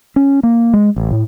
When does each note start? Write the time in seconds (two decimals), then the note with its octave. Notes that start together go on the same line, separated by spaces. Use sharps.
0.16 C#4
0.43 A#3
0.73 G#3
0.96 A1
1.11 A2